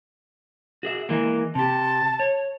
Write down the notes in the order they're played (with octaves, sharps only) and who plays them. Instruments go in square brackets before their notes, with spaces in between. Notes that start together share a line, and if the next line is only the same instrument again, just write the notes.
[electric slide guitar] F#4 G#4 E5
E3 G#3 A#3
[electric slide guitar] C3 G4 [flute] A5
[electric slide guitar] C#5